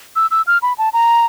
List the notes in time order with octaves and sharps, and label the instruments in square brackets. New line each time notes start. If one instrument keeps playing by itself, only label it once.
[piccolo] E6
E6
F6
B5
A5
A#5